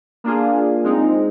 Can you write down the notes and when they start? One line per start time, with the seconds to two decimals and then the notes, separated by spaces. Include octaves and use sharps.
0.24 A#3 D4 F4 G#4
0.84 G#3 C4 D#4